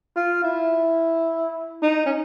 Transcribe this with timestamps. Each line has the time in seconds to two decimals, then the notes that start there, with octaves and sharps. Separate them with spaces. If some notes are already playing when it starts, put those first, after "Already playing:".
0.16 F4
0.44 E4
1.83 D#4
2.06 C#4